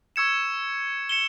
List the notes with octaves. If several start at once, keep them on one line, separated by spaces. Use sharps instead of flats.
C#6 E6 G#6 C#7 E7
C#7 E7 G7